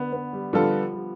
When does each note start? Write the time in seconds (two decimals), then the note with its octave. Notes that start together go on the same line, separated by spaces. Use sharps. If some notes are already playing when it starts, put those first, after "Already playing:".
Already playing: D3 B3
0.13 B3
0.33 G3
0.53 D3 F3 G3 B3 F4 A4
0.94 G3